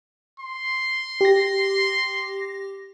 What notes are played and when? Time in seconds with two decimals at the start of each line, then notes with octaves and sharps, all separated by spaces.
0.40 C6
1.21 G4 A#6